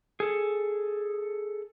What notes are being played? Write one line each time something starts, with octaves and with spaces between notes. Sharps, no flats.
G#4 A4